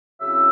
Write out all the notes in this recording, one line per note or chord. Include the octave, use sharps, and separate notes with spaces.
C#3 F#3 C4 E4 E5